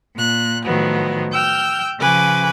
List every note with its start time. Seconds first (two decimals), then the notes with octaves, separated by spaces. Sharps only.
0.14 A#2 F#6
0.64 A2 D#3 F3 F#3 B3
1.32 G5 E6 F6 G6
1.98 C#3 F3 B4 G#5 D6